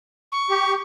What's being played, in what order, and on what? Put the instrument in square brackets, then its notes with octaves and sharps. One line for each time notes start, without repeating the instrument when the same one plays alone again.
[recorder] C#6
[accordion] G4